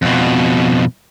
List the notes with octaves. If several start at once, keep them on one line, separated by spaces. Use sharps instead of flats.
F2 B2